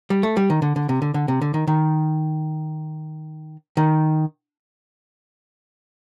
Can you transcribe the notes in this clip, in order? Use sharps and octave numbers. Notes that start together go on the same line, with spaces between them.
G3
A3
G3
D#3
D3
D3
C3
D3
D3
C3
D3
D#3
D#3
D#3